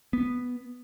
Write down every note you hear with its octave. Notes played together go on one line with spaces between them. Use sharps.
B3